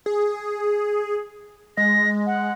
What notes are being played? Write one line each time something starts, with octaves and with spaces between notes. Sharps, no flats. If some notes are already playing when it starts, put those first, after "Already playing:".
G#4
G#3 A#6
F#5